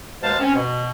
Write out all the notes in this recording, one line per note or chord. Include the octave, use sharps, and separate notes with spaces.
D#2 B2 G#3 C5 F5 A5
C4 C#4
B2